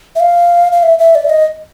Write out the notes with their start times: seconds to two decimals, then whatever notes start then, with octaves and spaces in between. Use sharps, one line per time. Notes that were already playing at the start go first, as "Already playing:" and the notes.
0.16 E5
0.20 F5
0.72 F5
0.83 E5
0.99 E5
1.15 D5
1.25 E5
1.30 D#5